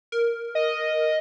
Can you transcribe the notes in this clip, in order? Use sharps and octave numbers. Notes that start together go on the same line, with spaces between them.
A#4
D#5